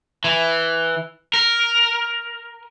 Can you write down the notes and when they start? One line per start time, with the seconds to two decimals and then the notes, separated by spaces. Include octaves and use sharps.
0.24 E3
1.34 A#4